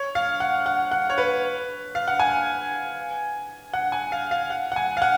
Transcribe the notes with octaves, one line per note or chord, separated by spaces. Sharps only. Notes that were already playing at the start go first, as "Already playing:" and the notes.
Already playing: C#5
F5
F#5
F#5
F#5
C#5
B4
F5
F#5
G#5
F#5
G#5
F5
F5
F#5
F#5
G#5
F5
F#5